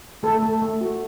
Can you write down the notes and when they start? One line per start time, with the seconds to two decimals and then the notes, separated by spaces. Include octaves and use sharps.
0.23 A3 A4
0.42 A3
0.62 A3
0.81 F#4